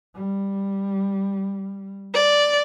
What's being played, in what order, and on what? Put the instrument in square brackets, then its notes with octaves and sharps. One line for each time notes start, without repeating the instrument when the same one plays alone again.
[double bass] G3
[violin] D5